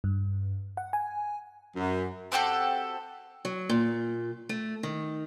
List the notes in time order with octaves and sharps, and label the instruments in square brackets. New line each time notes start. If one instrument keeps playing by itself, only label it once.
[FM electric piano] G2
F#5
G#5
[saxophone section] F#2
[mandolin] C4 F#4 G4 A4
[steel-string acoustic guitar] F#3
A#2
A3
D#3